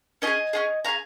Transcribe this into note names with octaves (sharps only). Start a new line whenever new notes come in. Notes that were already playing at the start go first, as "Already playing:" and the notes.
C#4 F4 D#5 G#5
G#4
C#4 F4 G#4
C#4 G#4 F5 A#5